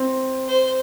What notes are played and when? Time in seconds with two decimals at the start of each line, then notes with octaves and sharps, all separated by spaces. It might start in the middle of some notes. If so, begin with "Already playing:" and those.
Already playing: C4
0.48 C5